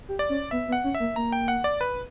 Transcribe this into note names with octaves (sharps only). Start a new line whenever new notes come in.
G4
D5
C#4
B3 E5
B3
F#5
C#4
E5
A#3
A#3 A#5
G5
F#5
D5
B4